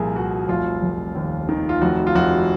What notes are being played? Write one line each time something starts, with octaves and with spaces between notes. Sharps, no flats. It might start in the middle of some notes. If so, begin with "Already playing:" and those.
Already playing: C2 A#2 F3 G#4 A#4
C2 F#4
F1 F4
F1
D#2
D#3
F4
F1 F#4
F4
F1 F#4